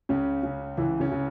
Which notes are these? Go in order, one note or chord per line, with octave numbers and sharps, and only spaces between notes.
C#2 C#3 C#4
C#3
C#2 E3 E4
C#3 C#4
C#3